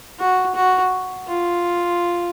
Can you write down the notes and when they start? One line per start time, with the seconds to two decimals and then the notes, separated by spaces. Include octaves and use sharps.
0.19 F#4
0.55 F#4
1.28 F4